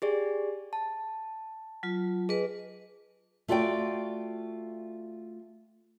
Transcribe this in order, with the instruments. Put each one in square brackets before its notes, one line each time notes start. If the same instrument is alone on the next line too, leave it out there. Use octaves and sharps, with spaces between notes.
[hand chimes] G4 G#4 D5
A5
[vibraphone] F#3 F4
[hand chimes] G#4 [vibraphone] B4 D#5
[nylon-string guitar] A3 F4 F#4 D5 G5